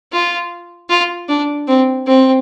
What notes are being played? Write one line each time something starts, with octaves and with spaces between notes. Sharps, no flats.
F4
F4
D4
C4
C4